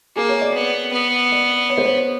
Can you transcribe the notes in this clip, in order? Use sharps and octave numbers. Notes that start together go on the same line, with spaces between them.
A#3 G#4
C#5
D5
B3
B3
D5
C#5
C5
C#5